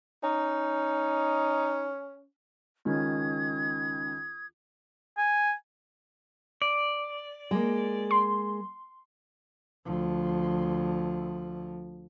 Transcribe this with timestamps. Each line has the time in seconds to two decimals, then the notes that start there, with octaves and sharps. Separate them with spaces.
0.23 C#4 D#4
2.85 C#2 D#3 C#4 D#6 G#6
5.17 G#5
6.62 D5
7.51 G#3 A#3
8.11 C6
9.86 D2 F3